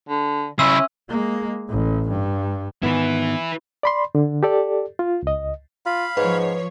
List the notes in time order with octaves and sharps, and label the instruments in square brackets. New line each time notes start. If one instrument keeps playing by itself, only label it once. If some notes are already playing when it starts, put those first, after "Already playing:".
[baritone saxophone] D3
[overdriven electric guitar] C#3 E4 [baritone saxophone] C#4 [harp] E5 C6 [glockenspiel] E6
[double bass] G#3 A#3
A1
G2
[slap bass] G#2 D#3 [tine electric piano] B3 [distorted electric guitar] E4 B4
[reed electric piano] D5 B5 C6
D3
G4 A4 D5
F4
C#2 D#5
[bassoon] F4 [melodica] F5 B5
[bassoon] G#2 [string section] F3 C#5 [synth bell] B4